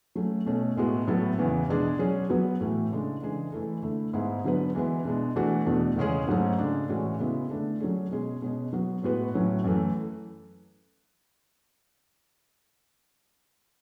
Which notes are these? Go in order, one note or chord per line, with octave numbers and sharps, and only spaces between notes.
F#3 A3 C#4
B2 A3 C#4
A2 G#3 B3 F#4
A2 F#3 B3 E4 A4
E2 C#3 E3 B3
E2 B2 G#3 D4 G#4
F#3 C#4 G#4
F#3 B3 F#4 B4
A2 E3 A3
C#3 G#3 D4 A4
C#3 E3 G#3 D4 G#4
E3 A3 E4 A4
D3 A3 E4
G#2 G#3 B3 E4 G#4
D3 F#3 B3 F#4 B4
E3 G#3 B3 E4 B4
B2 G#3 D4
E3 A3 D4 F#4
E2 B2 A3 D4
E2 C#3 G#3 C#4 G#4
G#2 F#3 A3 C#4
C#3 G#3 D4
A2 E3 G#3 C#4 F#4
C#3 G#3 B3 E4
D3 A3 D4 A4
F#3 C#4 G#4
B2 G#3 C#4 G#4
B2 G#3 C#4 G#4
F#3 B3 F#4
A2 G#3 B3 F#4 B4
A2 F#3 C#4
F#2 E3 A3